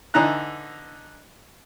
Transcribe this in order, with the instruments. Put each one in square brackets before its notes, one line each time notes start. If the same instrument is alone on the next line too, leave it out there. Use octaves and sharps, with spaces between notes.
[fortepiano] D3 E3 D#4 A#5 F#6